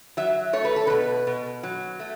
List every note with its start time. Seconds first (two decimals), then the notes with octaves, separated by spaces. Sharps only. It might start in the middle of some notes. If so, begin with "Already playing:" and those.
0.17 F#3 E5
0.53 A3 C#5
0.65 B4
0.76 A4
0.87 B2 B4
1.27 B2
1.63 F#3
2.00 A3